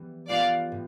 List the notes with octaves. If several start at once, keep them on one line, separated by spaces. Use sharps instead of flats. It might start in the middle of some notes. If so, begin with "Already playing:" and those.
Already playing: E3 G3 B3
G3 B3 F4 D5 F5
A2